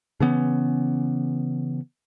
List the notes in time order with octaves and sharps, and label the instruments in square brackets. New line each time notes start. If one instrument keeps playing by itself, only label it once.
[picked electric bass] C#3 E3 B3 C#4